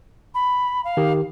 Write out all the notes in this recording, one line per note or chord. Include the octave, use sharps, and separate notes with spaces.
B5
F5
D#3 G4